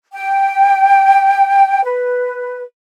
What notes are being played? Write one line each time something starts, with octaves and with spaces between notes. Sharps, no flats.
G5
B4